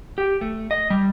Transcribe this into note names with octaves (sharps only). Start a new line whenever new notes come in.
G4
A3
D#5
G3